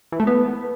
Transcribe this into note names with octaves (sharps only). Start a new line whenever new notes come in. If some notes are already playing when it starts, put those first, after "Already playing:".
E3
A3
B3